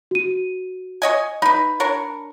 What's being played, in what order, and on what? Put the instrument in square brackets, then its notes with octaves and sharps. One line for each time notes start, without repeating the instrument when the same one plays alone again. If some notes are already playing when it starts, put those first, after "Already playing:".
[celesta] F#4 D#7
[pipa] C#5 D#5 G#5
[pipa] D#4 B4 [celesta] B5
[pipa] D4 A#4 C#5